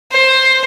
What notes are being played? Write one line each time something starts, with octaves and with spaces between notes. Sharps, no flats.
C5